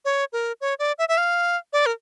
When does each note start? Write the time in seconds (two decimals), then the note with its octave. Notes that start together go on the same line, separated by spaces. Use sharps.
0.05 C#5
0.33 A#4
0.61 C#5
0.79 D5
0.99 E5
1.09 E5
1.18 F5
1.73 D5
1.86 A#4